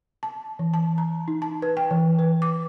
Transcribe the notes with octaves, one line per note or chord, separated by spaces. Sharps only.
A5
E3
A5
A#5
D#4
A5
B4
G5
E3
B4
D6